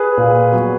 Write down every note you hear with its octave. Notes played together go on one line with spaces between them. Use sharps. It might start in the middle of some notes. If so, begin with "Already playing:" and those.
Already playing: G#4 B4
A#2
F#3 B3